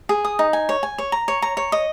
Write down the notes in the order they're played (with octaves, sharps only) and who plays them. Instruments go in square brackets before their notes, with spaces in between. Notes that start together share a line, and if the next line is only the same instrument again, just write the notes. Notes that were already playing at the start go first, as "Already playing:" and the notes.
[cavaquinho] G#4
D#6
D#4
G#5
C#5
G#5
C#5
A#5
C#5
A#5
C#5
D#5